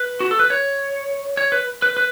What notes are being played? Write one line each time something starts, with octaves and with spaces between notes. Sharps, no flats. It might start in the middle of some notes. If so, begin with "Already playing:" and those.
Already playing: B4
F#4
A4
B4
C#5
C#5
B4
B4
B4